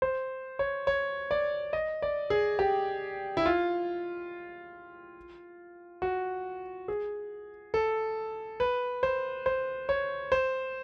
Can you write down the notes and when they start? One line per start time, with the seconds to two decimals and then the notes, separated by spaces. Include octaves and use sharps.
0.02 C5
0.59 C#5
0.87 C#5
1.31 D5
1.73 D#5
2.02 D5
2.30 G#4
2.59 G4
3.37 E4
3.46 F4
6.02 F#4
6.88 G#4
7.74 A4
8.60 B4
9.03 C5
9.46 C5
9.89 C#5
10.32 C5